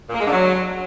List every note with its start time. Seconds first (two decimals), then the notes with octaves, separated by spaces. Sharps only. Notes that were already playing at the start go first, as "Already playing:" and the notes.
0.08 A#2
0.14 A#3
0.20 G#3
0.26 D3
0.32 F#3